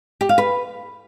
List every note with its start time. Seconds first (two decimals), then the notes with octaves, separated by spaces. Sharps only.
0.21 G4
0.29 F5
0.38 B4